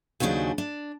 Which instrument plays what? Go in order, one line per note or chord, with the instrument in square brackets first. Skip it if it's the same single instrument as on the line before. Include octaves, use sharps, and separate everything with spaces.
[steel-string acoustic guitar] D#2 C#3 F#3 C#4 D4 C5
D4